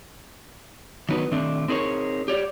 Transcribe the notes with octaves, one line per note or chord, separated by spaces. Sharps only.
D#3 F#3 B3 D#4 A#4 B4
D#3 A3 C4 D4
C4 D#4 G#4 A#4 C#5
G4 C#5 D5